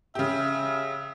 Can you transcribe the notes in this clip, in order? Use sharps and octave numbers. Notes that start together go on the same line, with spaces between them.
C#3 G4 E5